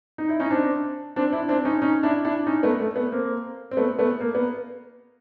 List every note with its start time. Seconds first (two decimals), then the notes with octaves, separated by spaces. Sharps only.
0.18 D#4
0.29 E4
0.40 C#4 D#4
0.51 C4 D4
1.16 C4 D4
1.33 D4 E4
1.49 C4 D4
1.65 C#4 D#4
1.82 C#4 D#4
2.03 D4 E4
2.25 D4 E4
2.46 C#4 D#4
2.63 A3 B3
2.80 A3
2.96 A3 B3
3.12 A#3 C4
3.71 C4
3.77 A3 B3
3.98 A3 B3
4.21 A#3
4.35 B3